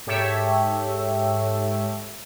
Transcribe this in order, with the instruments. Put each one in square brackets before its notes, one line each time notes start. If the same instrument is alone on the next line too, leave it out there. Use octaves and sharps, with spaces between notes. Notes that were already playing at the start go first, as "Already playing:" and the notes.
[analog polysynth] G#2 G4 A4 C#5 E5